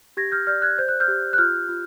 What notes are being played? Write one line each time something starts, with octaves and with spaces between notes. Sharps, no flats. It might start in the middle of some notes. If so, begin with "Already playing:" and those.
G4 G#6 A#6
F6 G6
D5 F6 G6
F#6 G#6
C5 G6
F#6
F6 G6
G4
F#6
F4 F6 G6
F4